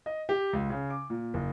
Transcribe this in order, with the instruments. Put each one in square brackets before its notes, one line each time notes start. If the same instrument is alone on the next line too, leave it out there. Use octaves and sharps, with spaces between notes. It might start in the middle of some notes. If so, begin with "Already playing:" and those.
[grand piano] D#5
G4
C#2
C#3
D6
A#2
F#1